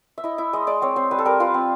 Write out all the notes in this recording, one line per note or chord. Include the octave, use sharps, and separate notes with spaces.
E5
E4 D#5
E4 E5
G#3 D#5
G#3 D5
C4 C#5
C4 C5
G3 B4
A4
G3 A#4
F4 B4
C4